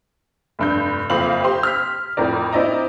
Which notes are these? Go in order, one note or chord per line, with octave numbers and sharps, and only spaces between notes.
F1 G2 G6
F#1 F2 C4 F5 B5 F#7
G4 C5 C6
F6 B6
F2 A2 A#4 D5
C4 E4 D5 D#5 A#5